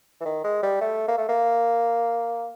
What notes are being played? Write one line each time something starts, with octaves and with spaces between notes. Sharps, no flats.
E3
D#3
G#3
G3
A3
A#3
A3
A#3